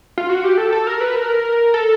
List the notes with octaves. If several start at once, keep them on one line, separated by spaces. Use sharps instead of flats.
F4
F#4
G4
A4
A4
A#4
B4
A#4
A4